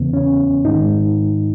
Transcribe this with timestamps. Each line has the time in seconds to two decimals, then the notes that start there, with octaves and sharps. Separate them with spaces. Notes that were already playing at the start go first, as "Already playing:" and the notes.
Already playing: E2 C#3 E3 B3
0.13 C#4
0.65 G#2 D#3 G#3 D#4